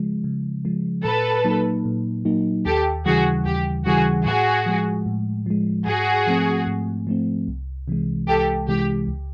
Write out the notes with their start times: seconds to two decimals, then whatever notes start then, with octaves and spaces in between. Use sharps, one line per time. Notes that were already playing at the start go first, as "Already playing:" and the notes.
Already playing: C#3 F3 G#3
0.24 C#3
0.65 F3 G#3
1.04 A#2 A4 B4
1.44 F#3 A#3 D#4
1.85 A#2
2.25 F#3 A#3 D#4
2.65 D#2 G4 A4
3.06 C#3 E3 G3 F#4 G#4
3.45 D#2 G4
3.86 C#3 E3 G3 F#4 G#4
4.25 A2 F#4 G#4
4.66 F3 G#3
5.06 A2
5.46 F3 G#3
5.87 G#2 F#4 G#4
6.27 F3 A3 C4
6.67 G#2
7.07 F3 A3 C4
7.48 C2
7.88 C3 E3 G#3
8.28 C2 G4 A4
8.68 C3 E3 G#3 G4
9.08 C#2